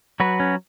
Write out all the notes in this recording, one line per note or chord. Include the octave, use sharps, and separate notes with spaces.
F#3 F#4 B4
C#4